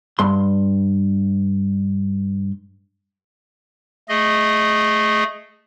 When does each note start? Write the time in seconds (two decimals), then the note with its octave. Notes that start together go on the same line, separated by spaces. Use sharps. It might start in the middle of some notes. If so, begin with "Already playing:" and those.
0.19 G2 C6
4.09 A3 G#4 D#5